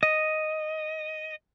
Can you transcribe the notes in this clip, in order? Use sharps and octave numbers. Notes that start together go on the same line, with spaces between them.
D#5